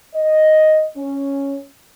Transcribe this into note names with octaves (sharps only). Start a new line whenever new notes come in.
D#5
C#4